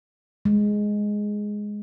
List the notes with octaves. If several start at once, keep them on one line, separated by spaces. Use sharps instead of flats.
G#3